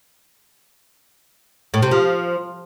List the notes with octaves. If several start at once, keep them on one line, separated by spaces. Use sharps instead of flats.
A2
C3
F3